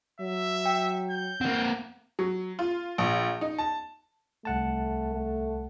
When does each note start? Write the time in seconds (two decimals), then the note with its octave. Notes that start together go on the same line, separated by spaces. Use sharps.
0.20 F#3 E5
0.66 G5
1.11 G6
1.41 A#3 C4 F#5
2.19 F#3
2.59 F4
2.98 A#1
3.41 D#4
3.59 A5
4.45 C2 A3 F#5 A5
5.15 A3